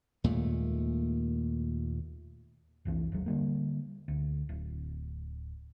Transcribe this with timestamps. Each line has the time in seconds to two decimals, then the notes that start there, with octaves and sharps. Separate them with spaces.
0.24 D#2 A#2 G#3 A3
2.85 F1 C2 E3
3.12 F#1 D#2 F#3
3.26 D3 G3 A#3
4.08 D2
4.49 D1